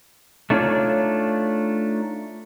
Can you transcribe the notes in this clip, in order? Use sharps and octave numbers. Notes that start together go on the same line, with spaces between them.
A3 D4 D#4 F4 B4 C#5